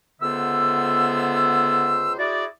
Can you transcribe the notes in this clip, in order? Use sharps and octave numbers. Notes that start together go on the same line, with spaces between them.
C#2 D3 B3 C5 E5 E6
E4 F#4 G#4 D5